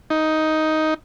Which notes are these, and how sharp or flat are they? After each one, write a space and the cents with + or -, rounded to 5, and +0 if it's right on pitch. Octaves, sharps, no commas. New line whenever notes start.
D#4 +10